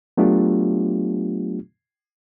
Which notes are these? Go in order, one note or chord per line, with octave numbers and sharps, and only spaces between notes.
F#3 A3 B3 D4 F4 G4